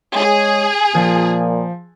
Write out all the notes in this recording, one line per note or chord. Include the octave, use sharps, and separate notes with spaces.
G#3 G#4 C#5
A#2 F3